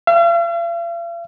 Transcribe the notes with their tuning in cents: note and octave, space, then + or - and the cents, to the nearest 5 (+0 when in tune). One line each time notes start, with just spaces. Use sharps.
F5 -45